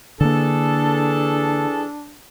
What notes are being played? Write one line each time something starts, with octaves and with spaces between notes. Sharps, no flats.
D3 E3 A#3 D4 G#4 A4